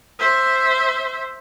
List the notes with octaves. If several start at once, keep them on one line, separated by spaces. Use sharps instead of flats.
C5 E5